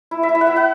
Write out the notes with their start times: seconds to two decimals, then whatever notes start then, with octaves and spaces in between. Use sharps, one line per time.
0.11 E4
0.23 E5
0.29 E4
0.35 E5
0.41 F#5
0.47 E4 E5
0.56 F#5